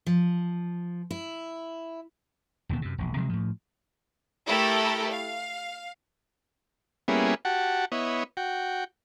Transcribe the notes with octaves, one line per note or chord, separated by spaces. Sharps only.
F3
E4
E1 D#2 A#2 B3
F#2 C3
E1 A#1
C3 F3 F#3 G#3
A2 F3
A3 E4 G4 A4 A#4
F5
G3 A#3 B3 C#4 E4 G#4
F#4 G4 F#5 A5
B3 E4 C#5 D#5
F#4 G5